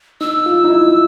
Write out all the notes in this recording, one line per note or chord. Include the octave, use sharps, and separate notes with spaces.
D#4 E6
F4
D#4
E4